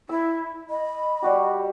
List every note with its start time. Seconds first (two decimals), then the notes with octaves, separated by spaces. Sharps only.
0.09 E4 E6
0.70 D#5 B5
1.22 G3 F#4 G4